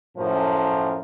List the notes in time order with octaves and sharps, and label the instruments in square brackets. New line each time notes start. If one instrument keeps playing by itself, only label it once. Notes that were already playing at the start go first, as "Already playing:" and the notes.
[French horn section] F#2 A2 F3